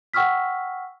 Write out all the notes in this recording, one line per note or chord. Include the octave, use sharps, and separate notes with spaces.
F#5 G5 C#6 E6 F6 B6